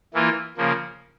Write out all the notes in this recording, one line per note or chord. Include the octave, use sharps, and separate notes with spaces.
E3 A#3 F4
C#3 F3 A#3